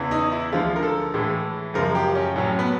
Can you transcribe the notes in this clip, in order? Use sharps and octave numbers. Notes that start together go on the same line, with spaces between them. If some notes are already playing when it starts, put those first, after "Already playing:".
Already playing: E2 C#3 E3
D#4
E4
D2 D3 F3 G#3 F4
A#4
A4
A2 E3 G#3
F#2 C#3 F3 G#3 A#4
G4
C#4
A2 F#3 C#4
B3